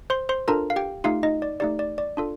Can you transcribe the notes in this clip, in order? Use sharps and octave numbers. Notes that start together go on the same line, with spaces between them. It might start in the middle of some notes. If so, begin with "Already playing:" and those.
C5 C6
C5 C6
D4 F4 A4 A#4 A#5
F5
G4 G5
A3 D#4 F4 G4 F5
D#4 D#5
D5
A3 D#4 G4 D5
D5
D5
D4 F4 A4